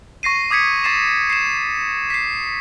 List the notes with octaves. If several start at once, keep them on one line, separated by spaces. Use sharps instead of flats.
C#6 A#6 C7 D#7
D6 D#6 G#6 B6 C#7
C#6 A6 C7 E7
C7 E7
B6 C7